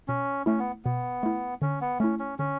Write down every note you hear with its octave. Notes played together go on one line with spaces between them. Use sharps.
B2 C#4
A3 C#4 E4
B3
B2 B3
A3 E4
D3 C#4
B3
A3 C#4 E4
C#4
D3 C#4